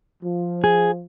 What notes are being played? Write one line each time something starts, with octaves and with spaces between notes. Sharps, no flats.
F3
G#4